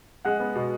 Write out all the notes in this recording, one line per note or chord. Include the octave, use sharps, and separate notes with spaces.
G#3 F#5 F#6
B3
B2